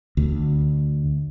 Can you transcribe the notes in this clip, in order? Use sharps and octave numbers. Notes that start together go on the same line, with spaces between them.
D2